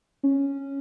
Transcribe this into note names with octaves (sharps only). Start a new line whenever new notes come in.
C#4